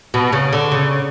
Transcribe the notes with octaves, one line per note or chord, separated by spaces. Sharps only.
B2
C#3
D3
C#3